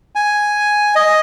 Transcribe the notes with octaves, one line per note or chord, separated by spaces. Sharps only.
G#5
D#5